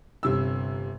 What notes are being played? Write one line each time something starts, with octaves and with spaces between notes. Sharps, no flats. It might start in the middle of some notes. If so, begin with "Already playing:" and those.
G1 C3 E6